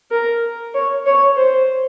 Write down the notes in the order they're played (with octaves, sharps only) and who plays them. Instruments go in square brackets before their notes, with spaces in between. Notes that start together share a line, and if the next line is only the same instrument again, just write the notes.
[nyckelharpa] A#4
C#5
C#5
C5